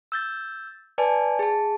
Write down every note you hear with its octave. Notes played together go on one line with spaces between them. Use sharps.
E6 G6 A6
B4 D5 G#5 A5
G#4 A5